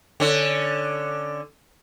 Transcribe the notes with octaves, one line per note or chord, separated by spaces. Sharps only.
D3 C#4